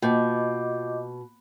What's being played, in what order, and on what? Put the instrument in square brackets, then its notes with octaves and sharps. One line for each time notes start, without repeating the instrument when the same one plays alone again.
[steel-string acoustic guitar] B2 [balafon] A#3 [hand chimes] F4 G6 [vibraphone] D#5 D6